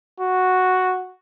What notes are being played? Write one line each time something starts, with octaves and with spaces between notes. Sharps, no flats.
F#4